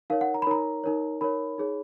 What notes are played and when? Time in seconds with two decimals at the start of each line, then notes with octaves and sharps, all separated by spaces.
0.10 D#4 A#4 C#5 F5
0.21 F#5
0.34 A#5
0.42 B5
0.47 D#4 A#4 C#5 A#5
0.84 D#4 A#4 C#5
1.21 D#4 A#4 C#5 B5
1.58 D#4 G#4 C#5